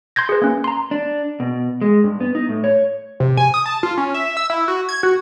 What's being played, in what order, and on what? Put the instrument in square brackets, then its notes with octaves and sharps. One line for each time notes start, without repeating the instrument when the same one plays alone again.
[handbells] C6 G6 G#6 A#6
G#4 B4
A#3 C#4
A#5 C6
[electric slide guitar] D4
B2
G#3
G2
B3
D#4
A2
C#5
[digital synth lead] C3
G#5
D#6
A5
F4
C#4
E5
E6
E4
F#4
G#6
F#4